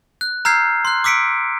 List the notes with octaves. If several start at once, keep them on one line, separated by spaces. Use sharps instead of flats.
F#6
A#5 E6 F6 G6 G#6 C7
C6 F#6
D6 E6 B6 C#7 D7